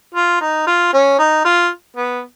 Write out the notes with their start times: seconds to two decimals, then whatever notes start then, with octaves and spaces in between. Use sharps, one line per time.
0.15 F4
0.41 D#4
0.67 F4
0.93 C#4
1.19 D#4
1.45 F4
1.97 B3